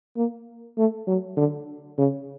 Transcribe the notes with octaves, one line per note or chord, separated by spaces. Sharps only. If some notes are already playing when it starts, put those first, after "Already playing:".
A#3
A3
F#3
D3
C#3